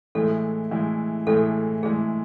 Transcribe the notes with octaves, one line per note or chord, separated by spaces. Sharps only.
A2 E3 G#3 A4
A2 E3 G#3
A2 E3 G#3 A4
A2 E3 G#3 G#4